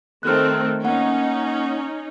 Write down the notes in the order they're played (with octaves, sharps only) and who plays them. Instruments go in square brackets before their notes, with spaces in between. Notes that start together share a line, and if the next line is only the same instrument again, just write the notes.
[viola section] D#3 A3 C4 [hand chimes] F6 F#6
[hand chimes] A#3 F#5 [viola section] C#4 D#4